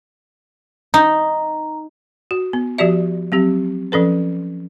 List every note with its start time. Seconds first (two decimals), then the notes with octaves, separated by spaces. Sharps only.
0.94 D#4 A#5
2.31 F#4
2.53 B3
2.78 F3 F#4 G4 D5 E5
3.32 F#3 C4 G4
3.92 F3 C#4 A4 B4